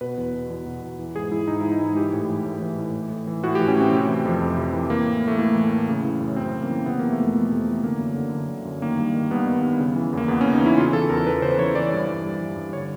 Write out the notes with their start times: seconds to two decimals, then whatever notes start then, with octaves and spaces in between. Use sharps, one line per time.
0.01 B2 B4
0.17 E2
0.34 B2
0.50 E2
0.66 B2
0.83 E2
0.99 E3
1.16 G#2 G#4
1.31 E3 E4
1.48 G#2 D#4
1.60 E4
1.63 E3
1.72 D#4
1.80 G#2 E4
1.96 E3 G4
2.13 A2
2.29 E3
2.45 A2
2.62 E3
2.78 A2
2.95 E3
3.10 A2
3.27 E3
3.44 A2 F#4
3.55 G4
3.60 E3
3.68 C#4
3.76 A2 C4
3.92 C3
4.08 E3
4.25 F2
4.42 F2
4.58 C3
4.73 E3
4.90 E3 A#3
5.07 A2
5.23 E3 A3
5.38 A2 A#3
5.55 E3
5.72 A2
5.89 C#3
6.05 E3
6.20 F#2
6.36 F#2 C4
6.54 C#3
6.62 A#3
6.69 E3
6.85 C3 B3
6.99 E3 A#3
7.12 A3
7.18 F2
7.25 A#3
7.35 F2
7.51 C3
7.68 E3
7.84 D3 A#3
8.00 F#2
8.16 D3
8.33 F#2
8.49 D3
8.65 F#2
8.82 D#3 A#3
8.98 G2
9.14 D#3
9.31 G2 B3
9.47 D#3
9.63 G2
9.79 C#3
9.96 E3
10.13 E2 A#3
10.28 E2 B3
10.41 C#4
10.45 C#3
10.53 D#4
10.60 E3
10.66 E4
10.77 C#3 F4
10.93 E3 A4
11.09 E2 A#4
11.27 E2 B4
11.42 C#3 C5
11.59 E3 C#5
11.75 E3 D5
11.92 G2
12.08 E3
12.24 G2
12.40 E3
12.56 G2
12.73 D3 C#5